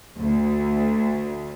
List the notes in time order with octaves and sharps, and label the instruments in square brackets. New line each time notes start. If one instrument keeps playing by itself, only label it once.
[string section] D2